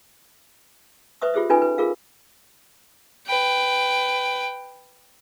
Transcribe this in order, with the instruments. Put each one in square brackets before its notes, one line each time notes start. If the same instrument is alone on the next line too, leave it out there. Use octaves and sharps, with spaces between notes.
[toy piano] B4 C5 E5 C#6 D#6
F4 G4 G#4 C5 E5
C#4 D#4 F4 A4 B4 G#5
B4
F4 G#4 A#4 F5
[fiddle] B4 G5